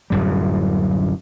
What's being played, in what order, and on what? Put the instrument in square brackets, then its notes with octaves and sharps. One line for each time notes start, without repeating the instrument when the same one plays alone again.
[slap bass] D1 F#2 G3